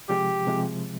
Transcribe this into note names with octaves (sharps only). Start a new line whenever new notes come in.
C3 F3 G#3 G4
C3 F3 G#3